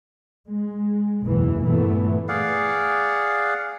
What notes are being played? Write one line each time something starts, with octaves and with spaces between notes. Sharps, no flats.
G#3
F#1 B1 E2 B2 E3
G2 A#2 E3 A3 B3
G#4 D5 F5 F#5